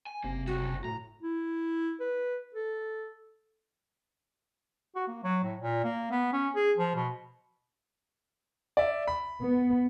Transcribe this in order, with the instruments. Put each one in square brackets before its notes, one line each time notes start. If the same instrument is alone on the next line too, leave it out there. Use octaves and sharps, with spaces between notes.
[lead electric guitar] G#5
[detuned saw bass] F#1 [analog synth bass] C3 [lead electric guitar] A#3
[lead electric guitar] C#3 G3 [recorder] F#4
[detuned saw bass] A2 [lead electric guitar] A#5
[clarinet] E4
B4
A4
[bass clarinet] F#4
A#3
F#3
A2
A#2
A#3
B3
C#4
G#4
F3
B2
[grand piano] D5 E5
B5
[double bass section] B3